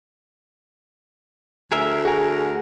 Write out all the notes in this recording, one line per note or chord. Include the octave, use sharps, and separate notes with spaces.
D2 G#4 A#4 E5
F#4 G#4 A#4 G#5